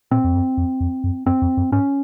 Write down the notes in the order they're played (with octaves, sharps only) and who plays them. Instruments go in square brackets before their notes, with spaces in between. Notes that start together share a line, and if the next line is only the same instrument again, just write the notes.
[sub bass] A#2 [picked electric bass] C4
[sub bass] F2
F#2
F2
F2
F#2
[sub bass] F#2 [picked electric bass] C4
[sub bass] F2
F#2
[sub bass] G#2 [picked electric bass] C#4